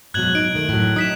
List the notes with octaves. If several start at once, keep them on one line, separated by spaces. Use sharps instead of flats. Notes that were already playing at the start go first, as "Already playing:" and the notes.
G#2 B2 F#3 F#6 G#6 F#7
D#4 D7
D#3 A3
A2 F#3
D#4 D#6 B6 E7